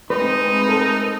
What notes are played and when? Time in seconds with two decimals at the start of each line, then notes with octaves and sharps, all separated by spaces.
0.10 G#3 A3 C4 D#4 B4
0.69 A4 A#4